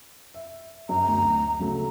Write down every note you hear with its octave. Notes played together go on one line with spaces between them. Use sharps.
E5
F#2 A#5
D2
C#3 F#3 A3